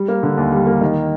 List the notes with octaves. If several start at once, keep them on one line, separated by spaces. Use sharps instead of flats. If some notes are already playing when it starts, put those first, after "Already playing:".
Already playing: G3
A#3
D3
D#2
G3
A#3
D#3